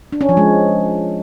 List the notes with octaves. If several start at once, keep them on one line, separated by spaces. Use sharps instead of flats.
D4
C#4
F3
G#3